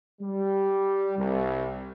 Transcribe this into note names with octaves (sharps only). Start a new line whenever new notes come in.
G3
C2